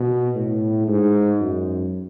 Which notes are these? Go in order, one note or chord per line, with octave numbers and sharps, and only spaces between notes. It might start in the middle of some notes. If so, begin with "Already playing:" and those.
Already playing: B2
A2
G#2
F#2